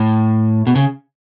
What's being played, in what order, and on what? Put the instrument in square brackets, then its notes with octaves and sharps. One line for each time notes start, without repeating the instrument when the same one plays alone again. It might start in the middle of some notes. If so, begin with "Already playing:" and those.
Already playing: [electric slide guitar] A2
B2
C#3